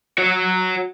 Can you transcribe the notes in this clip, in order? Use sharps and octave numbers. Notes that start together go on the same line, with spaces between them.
F#4 C#5